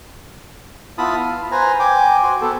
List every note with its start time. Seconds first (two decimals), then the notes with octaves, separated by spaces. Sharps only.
0.98 B3 E4 F4 A5 B5 D#6
1.18 F5
1.51 B4 C5 G#5 A#5
1.80 G5 G#5 D6
2.23 F#4 C5
2.41 B3 A4